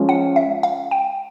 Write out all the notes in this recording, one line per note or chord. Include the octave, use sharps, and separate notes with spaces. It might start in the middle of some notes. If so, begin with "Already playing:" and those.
Already playing: F3 G#3 C#4
F#5
E5
F5
G5